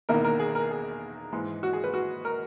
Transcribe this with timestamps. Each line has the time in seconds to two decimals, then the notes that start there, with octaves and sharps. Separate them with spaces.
0.09 E1 E2 D#3 A#3 E4 A#4
0.25 A#4
0.39 G#4
0.55 A#4
0.71 G#4
1.33 G#2 E3 G#3
1.63 F#4
1.73 G#4
1.84 B4
1.94 F#4
2.25 A#4